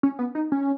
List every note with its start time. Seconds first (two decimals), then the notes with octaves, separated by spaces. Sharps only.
0.03 C#4
0.19 B3
0.35 D#4
0.52 C#4